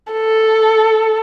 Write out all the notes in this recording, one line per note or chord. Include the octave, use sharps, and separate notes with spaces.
A4